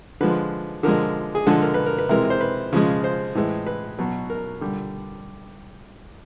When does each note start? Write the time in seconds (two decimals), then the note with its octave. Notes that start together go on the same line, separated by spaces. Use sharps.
0.21 D3 F3 G#3 B4
0.83 D3 F3 G#3 A#4
1.35 G#4
1.47 D3 F3 G#3 A4
1.62 A#4
1.74 B4
1.86 A#4
1.99 B4
2.09 C3 E3 G#3 A#4
2.30 C5
2.41 B4
2.73 C#3 F3 G#3
3.04 C5
3.35 A2 E3 G#3
3.67 B4
3.99 B2 F#3
4.30 A#4
4.61 D3 G3